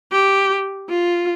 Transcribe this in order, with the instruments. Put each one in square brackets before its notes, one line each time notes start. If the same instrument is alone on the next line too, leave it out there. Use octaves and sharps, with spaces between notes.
[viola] G4
F4